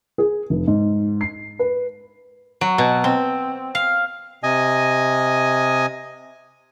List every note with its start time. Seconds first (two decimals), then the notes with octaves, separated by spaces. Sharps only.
0.18 G#4
0.50 F1
0.68 G#2
1.21 C7
1.59 B4
2.61 F#3
2.78 B2
3.04 C4
3.75 F5
4.43 C3 D#5 G#5